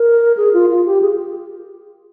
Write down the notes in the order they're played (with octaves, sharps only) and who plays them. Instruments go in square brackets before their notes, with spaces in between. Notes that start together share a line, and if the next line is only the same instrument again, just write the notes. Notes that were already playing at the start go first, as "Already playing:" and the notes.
Already playing: [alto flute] A#4
G#4
F4
F4
G4
G#4